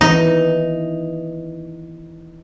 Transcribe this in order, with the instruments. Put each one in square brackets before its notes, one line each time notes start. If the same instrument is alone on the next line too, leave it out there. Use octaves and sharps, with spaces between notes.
[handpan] D#3 E3 [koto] D#4